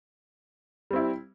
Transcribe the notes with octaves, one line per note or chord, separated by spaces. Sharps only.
G3 C4 E4